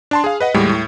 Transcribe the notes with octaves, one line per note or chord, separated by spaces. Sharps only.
D4 A5 C6
G#4 F5
B4 D#5 F#5
D#2 A2 G3 G#3
A2